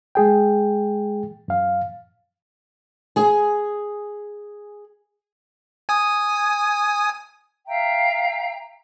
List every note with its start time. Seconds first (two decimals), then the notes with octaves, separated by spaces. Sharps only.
0.15 G#3 G#4 G5
1.48 F#2 F5
3.16 G#4 G#5
5.89 G#5 D#6
7.68 E5 F5 G5 A#5